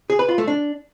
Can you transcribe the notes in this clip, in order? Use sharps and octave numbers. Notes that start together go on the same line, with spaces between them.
G#4
B4
F4
A3
D4